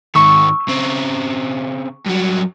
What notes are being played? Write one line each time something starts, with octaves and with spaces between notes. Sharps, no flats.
G#2 D#3 C#6 E6
C#3 C4
G2 F#3